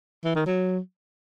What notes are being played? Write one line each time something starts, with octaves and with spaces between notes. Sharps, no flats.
E3
D#3
F#3